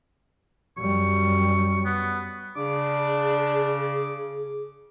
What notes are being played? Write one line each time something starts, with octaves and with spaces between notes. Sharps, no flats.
F#2 G3 C#6
B3
C#3 D4 G#4 D6